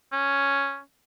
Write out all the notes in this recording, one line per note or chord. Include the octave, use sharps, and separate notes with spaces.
C#4